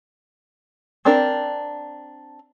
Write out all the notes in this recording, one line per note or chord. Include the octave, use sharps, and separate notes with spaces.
C4 D4 A#4